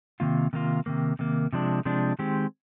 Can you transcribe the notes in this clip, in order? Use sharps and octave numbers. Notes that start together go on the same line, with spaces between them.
C3 D#3 A#3 F4
C3 D#3 A#3 F4
C3 D#3 A#3
C3 D#3 A#3
C3 F3 G#3 D4
C3 F3 G#3 D4
D#3 G#3 C4 G4